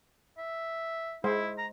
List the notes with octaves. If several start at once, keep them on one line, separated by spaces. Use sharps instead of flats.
E5
G#3 E4 C5
A#5